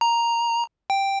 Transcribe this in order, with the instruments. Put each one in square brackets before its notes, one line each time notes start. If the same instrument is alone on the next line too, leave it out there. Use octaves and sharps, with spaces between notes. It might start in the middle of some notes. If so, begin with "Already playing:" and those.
[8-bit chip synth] A#5
G5